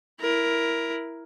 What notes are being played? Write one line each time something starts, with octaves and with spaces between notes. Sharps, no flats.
E4 A#4